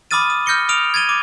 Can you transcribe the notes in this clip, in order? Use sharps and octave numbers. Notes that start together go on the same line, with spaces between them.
B5 D6 D#6 F6 A6 D#7
D#6
F6 G6 A#6 C#7 G7
D#6 F6 D7 F7
G#6 A6 D#7 G7
D6